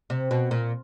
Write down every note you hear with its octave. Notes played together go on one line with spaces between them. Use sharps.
C3
B2
A#2